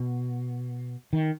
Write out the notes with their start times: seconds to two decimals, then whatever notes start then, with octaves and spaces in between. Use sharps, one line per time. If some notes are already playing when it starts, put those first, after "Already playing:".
Already playing: B2
1.13 D#3